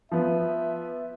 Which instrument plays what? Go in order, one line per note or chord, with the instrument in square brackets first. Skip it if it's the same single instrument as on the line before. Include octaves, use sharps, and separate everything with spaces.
[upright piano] F3 B3 [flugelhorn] E5